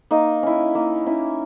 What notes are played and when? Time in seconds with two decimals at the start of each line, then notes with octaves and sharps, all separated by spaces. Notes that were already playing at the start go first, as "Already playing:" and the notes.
0.11 A#3 D#4 D#5
0.43 C#4 E4
0.75 A#3
1.06 C#4 E4